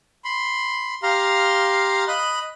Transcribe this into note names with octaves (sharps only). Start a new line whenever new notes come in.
B5 C6
G4 F5 A#5 C6 F6
D#5 B5 F#6